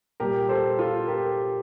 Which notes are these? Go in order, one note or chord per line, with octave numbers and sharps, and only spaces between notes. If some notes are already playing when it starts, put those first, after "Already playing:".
A#2 G3 G4 A#4
A4 C5
F4 A4
G4 A#4